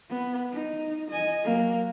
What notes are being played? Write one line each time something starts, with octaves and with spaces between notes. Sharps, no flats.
B3
D#4
D#5 G#5
F#3 A#3